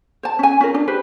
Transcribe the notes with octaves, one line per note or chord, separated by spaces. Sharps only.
C5 A5
C#4 G#5
C#4 F4 A#4
D4
G4 B4 C5